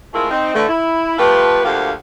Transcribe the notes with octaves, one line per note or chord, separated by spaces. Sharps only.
G#3 A3 C4 E4 F4 A#4
C4 D#4
A2 D3 E3 A3
E4
F3 A3 F4 G4 B4
D2 F3 A#3 G4 F5 F#5